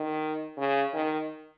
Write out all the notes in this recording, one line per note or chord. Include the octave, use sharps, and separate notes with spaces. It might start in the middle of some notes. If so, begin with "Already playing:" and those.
Already playing: D#3
C#3
D#3